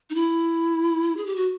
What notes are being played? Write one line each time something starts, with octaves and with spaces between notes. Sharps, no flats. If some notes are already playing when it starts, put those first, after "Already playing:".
D#4
E4
G#4
G4
F#4